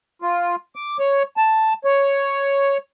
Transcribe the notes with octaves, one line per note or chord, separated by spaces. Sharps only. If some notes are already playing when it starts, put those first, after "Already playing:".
F4
D6
C#5
A5
C#5